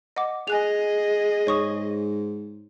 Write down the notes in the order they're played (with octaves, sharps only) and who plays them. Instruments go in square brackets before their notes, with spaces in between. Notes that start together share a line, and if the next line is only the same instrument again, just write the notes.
[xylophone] D#5 F#5 D6
[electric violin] G#4 D#5 [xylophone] G#5 F#6 F7
[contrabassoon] G#2 [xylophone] C#5 C#6 D#6